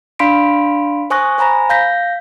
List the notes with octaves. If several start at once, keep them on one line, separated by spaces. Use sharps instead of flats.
D4 F5 B5 C6 B6 D7
C5 G#5 C#6 D#6 F#6 A#6
C5 G#5 A#5 B5 A#6
F5 G6 A#6 B6